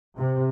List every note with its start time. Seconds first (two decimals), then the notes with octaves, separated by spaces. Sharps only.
0.18 C3